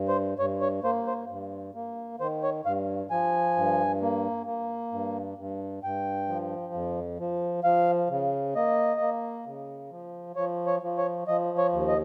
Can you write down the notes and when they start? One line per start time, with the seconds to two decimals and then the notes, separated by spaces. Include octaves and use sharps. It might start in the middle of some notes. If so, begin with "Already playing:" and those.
Already playing: G2
0.08 C5
0.39 G2 C#5
0.62 C#5
0.84 A#3 C5
1.07 C5
1.30 G2
1.75 A#3
2.20 D#3 C5
2.43 C#5
2.66 G2 F5
3.10 F3 G#5
3.56 G2
4.01 A#3
4.46 A#3
4.92 G2
5.38 G2
5.83 G2 G5
6.28 F3
6.74 F2
7.19 F3
7.64 F3 F5
8.10 C#3
8.55 A#3 D#5
9.01 A#3
9.46 C#3
9.91 F3
10.36 F3 C#5
10.67 C#5
10.82 F3
10.98 C#5
11.28 F3 D#5
11.58 C#5
11.73 D#2
11.88 D#5